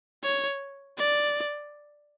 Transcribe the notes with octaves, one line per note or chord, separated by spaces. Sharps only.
C#5
D5